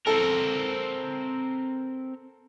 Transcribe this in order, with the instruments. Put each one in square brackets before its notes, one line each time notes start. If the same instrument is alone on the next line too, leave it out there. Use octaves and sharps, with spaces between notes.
[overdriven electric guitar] C4 A#4 [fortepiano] A4